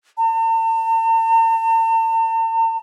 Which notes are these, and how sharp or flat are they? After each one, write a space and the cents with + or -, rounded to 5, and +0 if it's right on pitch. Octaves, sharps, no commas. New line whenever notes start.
A5 +45